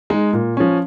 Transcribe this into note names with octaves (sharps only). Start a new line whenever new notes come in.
G#3 D#4
A#2
F3 C#4